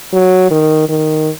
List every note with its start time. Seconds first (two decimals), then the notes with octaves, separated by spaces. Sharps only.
0.13 F#3
0.51 D#3
0.89 D#3